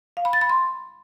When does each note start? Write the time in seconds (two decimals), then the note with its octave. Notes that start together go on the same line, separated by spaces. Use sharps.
0.17 F5
0.25 B5
0.33 A6
0.41 B5
0.50 C6